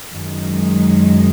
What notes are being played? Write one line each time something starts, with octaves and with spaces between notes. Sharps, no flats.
F#2 D#3 G#3